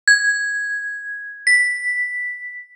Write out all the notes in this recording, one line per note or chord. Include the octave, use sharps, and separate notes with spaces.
G#6
B6